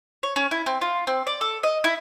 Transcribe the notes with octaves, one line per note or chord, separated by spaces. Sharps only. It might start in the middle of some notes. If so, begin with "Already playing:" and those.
C#5
C#4
E4
C4
F4
C4
D5
A4
D#5
E4